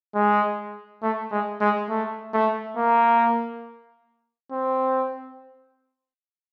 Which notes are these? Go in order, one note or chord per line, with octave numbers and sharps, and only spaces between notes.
G#3
A3
G#3
G#3
A3
A3
A#3
C4